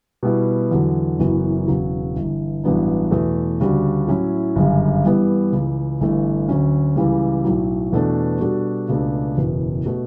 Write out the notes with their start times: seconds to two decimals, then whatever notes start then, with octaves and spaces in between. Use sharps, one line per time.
0.23 B2 G3 B3 E4
0.71 E2 D3 F#3
1.19 F#1 F#2 E3 B3 F#4
1.67 E1 E2 C#3 F#3
2.16 G1 G2 E3
2.64 A1 G2 F#3 B3 D4
3.11 E2 B2 A3
3.60 D2 C#3 G3 D4 F#4
4.07 A2 F#3 C#4 E4
4.55 G1 F#2 C#3 G3
5.04 G2 E3 G3 B3
5.52 C#2 C#3 E3
6.00 G1 G2 E3 A3 D4
6.48 D2 D3 F#3 C#4
6.96 C#2 C#3 E3 G3
7.44 B1 A2 F#3
7.92 E2 B2 A3 D4 A4
8.40 B2 G3 D4 F#4 A4
8.88 C#2 B2 A3 D4
9.37 F#1 E2 B2
9.86 B2 A3